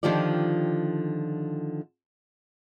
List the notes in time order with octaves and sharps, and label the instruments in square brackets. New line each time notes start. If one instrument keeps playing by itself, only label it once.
[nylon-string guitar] D3 D#3 F3 F4 G4 D5